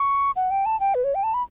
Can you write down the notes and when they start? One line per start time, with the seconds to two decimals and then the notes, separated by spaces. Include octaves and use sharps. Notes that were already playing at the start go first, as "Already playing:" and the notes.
Already playing: C#6
0.36 F#5
0.51 G5
0.66 A5
0.80 G5
0.95 B4
1.04 C#5
1.15 G5
1.23 A5
1.34 B5